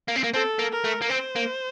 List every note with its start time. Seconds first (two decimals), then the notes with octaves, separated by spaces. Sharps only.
0.08 A#3
0.16 C4
0.24 A#3
0.34 C4 A4
0.59 A#3
0.72 A#4
0.84 A3
1.02 A#3
1.09 C4 C5
1.36 A#3